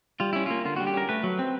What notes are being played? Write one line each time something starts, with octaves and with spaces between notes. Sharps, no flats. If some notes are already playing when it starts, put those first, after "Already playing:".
G3 F4
C#4 E4
A#3 F4
D3 F4
G3 F#4
G4
C#4 A#4
A3 B4
F#3
C4